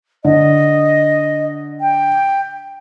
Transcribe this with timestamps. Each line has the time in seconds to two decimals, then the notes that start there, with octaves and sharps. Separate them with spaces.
0.25 D3 D#5
1.81 G5